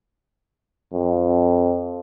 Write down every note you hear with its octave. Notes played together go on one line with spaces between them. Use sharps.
F2